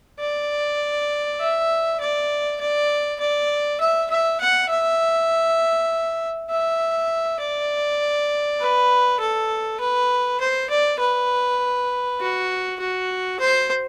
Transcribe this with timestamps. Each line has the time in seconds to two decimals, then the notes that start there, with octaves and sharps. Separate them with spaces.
0.20 D5
1.40 E5
2.00 D5
2.61 D5
3.20 D5
3.80 E5
4.10 E5
4.40 F#5
4.69 E5
6.50 E5
7.40 D5
8.60 B4
9.20 A4
9.80 B4
10.40 C5
10.70 D5
11.00 B4
12.20 F#4
12.80 F#4
13.40 C5